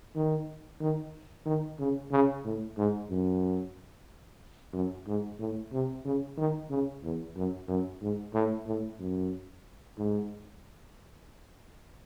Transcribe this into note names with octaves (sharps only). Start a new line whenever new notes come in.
D#3
D#3
D#3
C#3
C#3
A2
G#2
F#2
F#2
G#2
A2
C3
C#3
D#3
C#3
E2
F#2
F#2
G#2
A2
A2
F#2
G#2